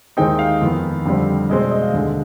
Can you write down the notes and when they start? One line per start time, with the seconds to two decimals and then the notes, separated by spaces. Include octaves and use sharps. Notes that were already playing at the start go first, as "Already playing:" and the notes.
0.17 D#2 D#3 G#3 C4 D#4 G5
0.39 F5
0.61 F2 D#3 B3
1.06 F2 D3 G3 C4
1.49 B2 G#3 C4 D#5
1.61 D5
1.71 D#5
1.82 F5
1.93 D#2 D3 G#3